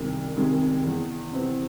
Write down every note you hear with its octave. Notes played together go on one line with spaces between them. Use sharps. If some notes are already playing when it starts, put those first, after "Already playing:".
Already playing: C2 C3 D#3 G#3
C3 D#3 G#3
E2
C3 E3 C4